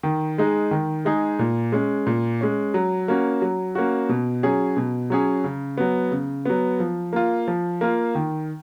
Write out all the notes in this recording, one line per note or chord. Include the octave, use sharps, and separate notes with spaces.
D#3
G#3 D#4 G#4
D#3
G#3 D#4 G#4
A#2
G#3 C#4
A#2
G#3 C#4
F#3
A#3 C#4 F#4
F#3
A#3 C#4 F#4
B2
F#3 C#4 G#4
B2
F#3 C#4 G#4
C#3
F#3 B3
C#3
F#3 B3
F3
A#3 F4
F3
A#3 F4
D#3